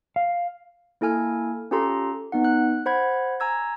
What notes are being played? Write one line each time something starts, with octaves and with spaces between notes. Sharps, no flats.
F5
A#3 E4 A4 G#5 F6
C#4 F4 G4 A4 A#5 C6
B3 D#4 F#5
F#6
C5 F#5 B5 G#6
G#5 A#5 E6 G#6